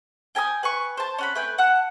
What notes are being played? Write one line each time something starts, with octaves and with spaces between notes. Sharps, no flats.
G5 G#5 A#5 D#6
B4 G#5 C#6
C5 A5
C#4 F#5 B5
A3 B4 G5 G#5
F#5 A5 F#6